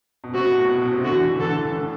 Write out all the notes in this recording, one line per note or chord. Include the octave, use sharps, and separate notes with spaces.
B2
C3 F#4
B2
A2
B2
B2
C3
D3 F#4
E3
D3
E3
D3
E3 A4
D3
E3
D3
A2